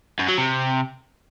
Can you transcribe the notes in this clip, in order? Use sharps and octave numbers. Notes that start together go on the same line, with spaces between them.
F#2
F#3
C3